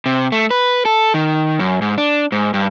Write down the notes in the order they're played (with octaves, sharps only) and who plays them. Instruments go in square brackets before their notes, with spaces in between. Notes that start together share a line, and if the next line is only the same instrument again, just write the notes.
[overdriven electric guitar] C3
A3
B4
A4
D#3
F#2
G#2
D4
G#2
G2